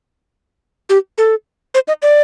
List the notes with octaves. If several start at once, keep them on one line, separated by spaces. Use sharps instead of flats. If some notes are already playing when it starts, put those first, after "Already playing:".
G4
A4
C5
D#5
D5